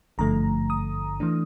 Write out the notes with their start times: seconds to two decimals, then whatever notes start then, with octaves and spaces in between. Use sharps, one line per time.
0.18 G#1 G2 D3 F3 A3 A#5
0.70 D#6
1.20 E3 A3 D4